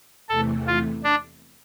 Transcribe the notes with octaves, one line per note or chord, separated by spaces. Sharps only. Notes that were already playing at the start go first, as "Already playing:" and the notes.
E2 C3 E3 A3 A4
F4
D4